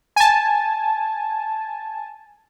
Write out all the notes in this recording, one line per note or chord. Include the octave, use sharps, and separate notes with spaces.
G#5 A5